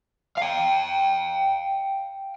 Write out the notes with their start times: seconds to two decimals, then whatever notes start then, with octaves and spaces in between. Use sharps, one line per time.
0.37 F5 G5